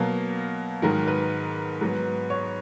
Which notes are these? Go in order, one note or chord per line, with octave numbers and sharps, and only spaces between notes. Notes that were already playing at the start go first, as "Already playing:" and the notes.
Already playing: B2 F#3 A#3 F5
G#2 D#3 F#3 A#4
B4
G#2 F#3 B3
C#5